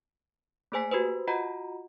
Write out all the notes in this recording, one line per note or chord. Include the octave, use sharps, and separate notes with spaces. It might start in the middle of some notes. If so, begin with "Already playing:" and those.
A3 A#3 G#4 C5 G#5 B6
F#4 G4 B4 C5
F4 F#4 D#5 F#5 A#5 B5